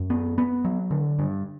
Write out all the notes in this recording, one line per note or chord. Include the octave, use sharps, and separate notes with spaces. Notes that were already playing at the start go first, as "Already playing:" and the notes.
Already playing: F#2
B3
B3
F#3
D3
G2